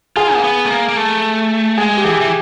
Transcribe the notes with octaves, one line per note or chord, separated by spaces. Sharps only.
F4 G#4
A#3
B3
A3
A#3
A#3
A3
G#3 G#4
G4
E3 G#4
E3